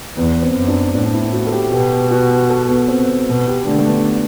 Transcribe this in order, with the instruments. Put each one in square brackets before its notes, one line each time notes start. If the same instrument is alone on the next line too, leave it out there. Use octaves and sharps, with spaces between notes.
[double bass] E2 [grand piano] B3
[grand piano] C4
[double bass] F#2
[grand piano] D4
[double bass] A2 [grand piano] D4
[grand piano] D4
E4
F#4
A4
G4
[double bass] B2 [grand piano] G4
[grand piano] F#4
A4
B3
C4
[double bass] B2
[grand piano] G4
[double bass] D3 [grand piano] A3
[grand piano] A3
B3